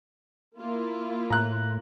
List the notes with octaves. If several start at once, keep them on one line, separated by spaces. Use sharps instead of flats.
A#3 E4 F4
A2 A#5 F#6